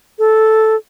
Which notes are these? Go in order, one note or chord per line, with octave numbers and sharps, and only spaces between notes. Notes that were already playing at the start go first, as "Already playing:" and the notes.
A4